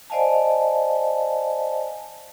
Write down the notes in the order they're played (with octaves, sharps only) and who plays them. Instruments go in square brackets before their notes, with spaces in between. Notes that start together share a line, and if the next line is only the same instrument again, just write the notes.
[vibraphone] C5 D5 D#5 F5 G#5 A5